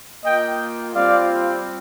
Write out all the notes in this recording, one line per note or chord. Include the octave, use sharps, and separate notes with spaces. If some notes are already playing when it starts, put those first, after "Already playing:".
A#3 F4 D#5 G5
G3 C4 F4 D5 F5